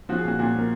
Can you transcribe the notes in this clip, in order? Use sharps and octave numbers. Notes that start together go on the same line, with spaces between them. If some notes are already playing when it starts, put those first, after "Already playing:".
F3 F#4
G#4
A#2 F#4
A#2 F#4
F3 A#4